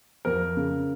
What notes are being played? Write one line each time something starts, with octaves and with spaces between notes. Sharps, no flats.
F2 A#4
C#3